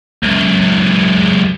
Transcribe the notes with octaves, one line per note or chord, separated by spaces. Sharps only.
C#2 F#2